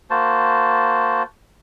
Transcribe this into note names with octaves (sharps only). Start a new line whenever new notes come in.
A#3 F#4 C5 A5